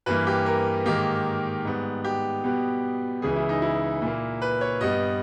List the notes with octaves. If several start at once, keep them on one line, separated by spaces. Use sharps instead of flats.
G2 E3 A#3 B4
G4
A#4
G#2 D#3 A#3 G4
G#2 G3 B3
G4
B2 G3 B3
C#2 C#3 E3 G#4
E4
D#4
E4
A#2 A#3
B4
C#5
G2 G3 B3 D#5